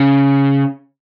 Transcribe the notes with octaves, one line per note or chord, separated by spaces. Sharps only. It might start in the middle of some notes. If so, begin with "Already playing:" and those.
Already playing: C#3